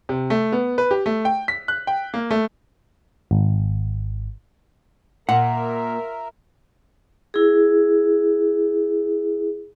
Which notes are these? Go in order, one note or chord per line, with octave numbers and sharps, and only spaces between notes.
C3
A3
B3
B4
G4
A3
G5
B6
F#6
G5
A#3
A3
G#1
A#2 A#4 E5 F#5
E4 G#4